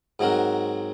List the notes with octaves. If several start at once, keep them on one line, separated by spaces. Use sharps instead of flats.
G#2 F#3 C4 F#4 A#4